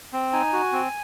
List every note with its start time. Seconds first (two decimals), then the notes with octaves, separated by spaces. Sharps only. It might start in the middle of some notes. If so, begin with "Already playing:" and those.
0.13 C4
0.33 D#4 G#5
0.53 F#4
0.73 C4